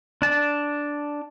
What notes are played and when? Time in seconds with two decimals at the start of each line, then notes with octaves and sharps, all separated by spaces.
0.22 D4 A5